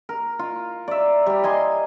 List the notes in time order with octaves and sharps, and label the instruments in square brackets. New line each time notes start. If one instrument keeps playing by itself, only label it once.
[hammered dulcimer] A#4
F4
D5 E5
G3 G4
D#5 G#5 A#5 C6